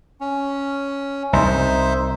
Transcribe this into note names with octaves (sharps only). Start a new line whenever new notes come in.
C#4
C2 D#4 C5 E5